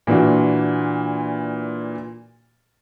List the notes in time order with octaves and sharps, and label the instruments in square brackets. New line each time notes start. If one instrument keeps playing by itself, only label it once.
[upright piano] A#2 E3 D4 F4 F#4